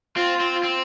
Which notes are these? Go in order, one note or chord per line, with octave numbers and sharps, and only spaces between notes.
C4 F4
C4
C4